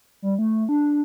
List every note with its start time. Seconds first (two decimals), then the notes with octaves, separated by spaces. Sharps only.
0.22 G3
0.39 A3
0.69 D4